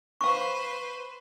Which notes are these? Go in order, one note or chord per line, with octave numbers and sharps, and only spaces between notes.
B4 C5 F5 C#6